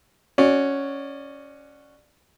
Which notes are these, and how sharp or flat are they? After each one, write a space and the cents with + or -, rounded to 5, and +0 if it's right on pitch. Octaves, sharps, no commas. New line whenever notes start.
C#4 +0 F#4 +0 D5 +20